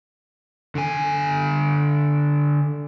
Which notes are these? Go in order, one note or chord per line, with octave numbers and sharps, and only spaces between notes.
D3 G#5